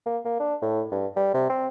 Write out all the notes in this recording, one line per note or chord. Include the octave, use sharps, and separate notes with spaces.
A#3
A#3
D4
A2
G2
G3
C3
C4